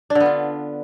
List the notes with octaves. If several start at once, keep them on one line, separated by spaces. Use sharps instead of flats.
D4
D3
B3
F4